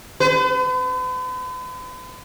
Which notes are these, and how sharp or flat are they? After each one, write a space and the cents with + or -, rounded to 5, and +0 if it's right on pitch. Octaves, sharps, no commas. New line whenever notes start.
B4 +45